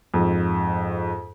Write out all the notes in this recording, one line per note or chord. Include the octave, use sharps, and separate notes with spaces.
F2 G#2